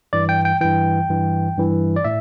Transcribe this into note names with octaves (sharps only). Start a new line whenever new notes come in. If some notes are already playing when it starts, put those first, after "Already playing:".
G2 E3 D5
G5
G5
G2 E3 G5
G2 E3
G2 E3
D5
A2 E5